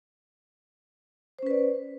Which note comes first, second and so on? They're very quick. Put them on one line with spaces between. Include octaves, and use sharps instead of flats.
C5 C#4 B4 D5